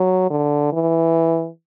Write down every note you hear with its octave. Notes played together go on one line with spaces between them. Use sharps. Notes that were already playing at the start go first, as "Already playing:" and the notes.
Already playing: F#3
D3
E3